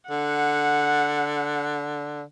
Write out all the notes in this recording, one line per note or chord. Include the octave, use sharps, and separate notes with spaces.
D3 F#5